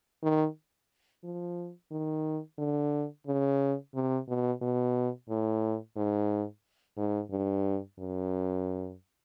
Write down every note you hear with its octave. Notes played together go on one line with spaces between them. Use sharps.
D#3
F3
D#3
D3
C#3
C3
B2
B2
A2
G#2
G#2
G2
F#2